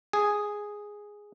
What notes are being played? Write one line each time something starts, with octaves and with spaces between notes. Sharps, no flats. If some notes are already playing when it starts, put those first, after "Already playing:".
G#4